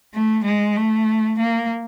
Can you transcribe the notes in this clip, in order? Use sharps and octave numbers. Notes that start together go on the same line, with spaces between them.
A3
G#3
A3
A#3